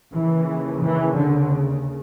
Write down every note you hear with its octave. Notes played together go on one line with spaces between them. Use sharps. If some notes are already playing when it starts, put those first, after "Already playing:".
D#2 C#3 E3
E3
D3